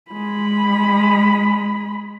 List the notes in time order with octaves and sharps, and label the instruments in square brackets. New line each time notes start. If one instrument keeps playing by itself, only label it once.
[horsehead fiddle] G#3 B5